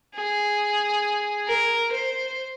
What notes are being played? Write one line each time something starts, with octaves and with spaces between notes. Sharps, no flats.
G#4
A#4
C5